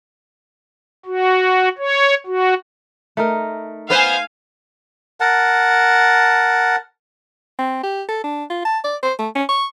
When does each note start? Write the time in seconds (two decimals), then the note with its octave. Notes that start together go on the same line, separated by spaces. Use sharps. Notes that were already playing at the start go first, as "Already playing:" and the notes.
1.05 F#4
1.78 C#5
2.26 F#4
3.17 A3 D#4 A#4
3.90 B3 B4 C5 F5 G#5
5.20 A#4 F#5 A5
7.59 C4
7.83 G4
8.09 A4
8.24 D4
8.50 F4
8.65 A5
8.84 D5
9.03 C5
9.19 A3
9.35 C#4
9.49 C#6